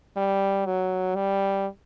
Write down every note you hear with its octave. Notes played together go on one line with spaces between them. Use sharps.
G3
F#3
G3